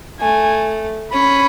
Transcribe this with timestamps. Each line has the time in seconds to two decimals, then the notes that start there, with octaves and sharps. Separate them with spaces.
0.20 A3 G#5
1.12 C#4 B5